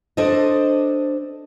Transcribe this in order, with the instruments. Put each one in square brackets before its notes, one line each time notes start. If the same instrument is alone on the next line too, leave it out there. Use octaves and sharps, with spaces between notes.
[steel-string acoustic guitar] D4 A4 C5 D#5